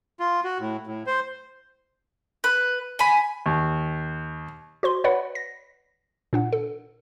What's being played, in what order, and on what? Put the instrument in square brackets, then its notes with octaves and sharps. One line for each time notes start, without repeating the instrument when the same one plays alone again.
[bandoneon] F4
F#4
A2
A2
C5
[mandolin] B4
G#5 B5
[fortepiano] D#2
[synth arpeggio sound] F#4 C5 C6
B4 C#5 D5 F#5 B5
A#6
A#2 D4 F#5
A4